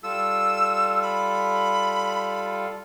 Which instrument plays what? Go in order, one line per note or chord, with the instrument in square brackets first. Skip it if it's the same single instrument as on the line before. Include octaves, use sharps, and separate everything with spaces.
[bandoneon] G3 F4 A4 [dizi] E6
[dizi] B5